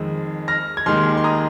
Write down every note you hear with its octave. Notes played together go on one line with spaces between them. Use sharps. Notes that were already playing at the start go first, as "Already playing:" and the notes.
Already playing: F2 D#3 G#3
F6 A#6
G#6
D#2 D#3 G#3 C6 F6
C6
A#5 D#6